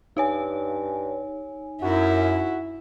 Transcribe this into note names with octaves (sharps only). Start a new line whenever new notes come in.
G2 D#4 C#5 G#5
F#2 E4 F#4